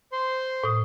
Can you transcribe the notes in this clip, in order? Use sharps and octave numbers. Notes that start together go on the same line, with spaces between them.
C5 C6
A2 D#6